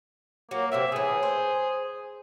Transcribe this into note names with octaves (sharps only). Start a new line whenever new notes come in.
F#3 A#3
C3 C4 F#4 E5
A2 E3 G#4
C5